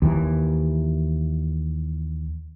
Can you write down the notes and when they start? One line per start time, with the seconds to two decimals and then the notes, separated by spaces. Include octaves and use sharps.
0.02 D#2 E3